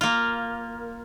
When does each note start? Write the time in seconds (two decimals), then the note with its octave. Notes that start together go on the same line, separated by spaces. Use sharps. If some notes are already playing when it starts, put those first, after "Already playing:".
0.01 A#3 F4